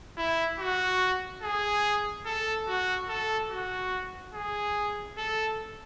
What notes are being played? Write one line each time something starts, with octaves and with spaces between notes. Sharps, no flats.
E4
F#4
G#4
A4
F#4
A4
F#4
G#4
A4